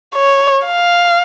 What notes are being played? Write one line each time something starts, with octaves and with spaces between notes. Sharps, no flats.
C#5
F5